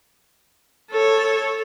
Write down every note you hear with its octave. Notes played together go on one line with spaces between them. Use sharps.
A4 C#5